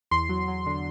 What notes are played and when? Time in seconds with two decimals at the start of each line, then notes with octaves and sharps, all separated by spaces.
0.11 E2 C6
0.29 F#3
0.48 F#3
0.66 D3